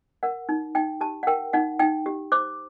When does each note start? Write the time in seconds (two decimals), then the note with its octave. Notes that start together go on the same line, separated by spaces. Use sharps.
0.23 A#4 F#5
0.49 D#4
0.75 D#4 G5
1.01 G4 A5
1.23 F#5
1.27 A#4 G5
1.53 D#4 F#5
1.79 D#4 G5
2.06 G4
2.32 C5 D6